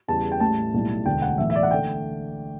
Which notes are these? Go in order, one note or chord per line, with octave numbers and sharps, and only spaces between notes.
E2 C#3 G3 A5
G5
A1 A2 G3 A5
B1 A2 G3
E1 D2 D3 A3 G5
F#5
B1 A2 E3 E5
E5
D5
F#5
D3 A3 G5